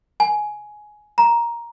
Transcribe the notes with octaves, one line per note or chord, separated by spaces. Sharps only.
G#5
A#5